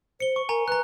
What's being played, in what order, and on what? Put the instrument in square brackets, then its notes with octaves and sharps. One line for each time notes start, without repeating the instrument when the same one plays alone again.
[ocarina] C5 [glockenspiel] C#7 G7
[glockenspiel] C#6
[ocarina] A#4 [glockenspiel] G#5 A#5
[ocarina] B4 [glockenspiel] A#5 F#6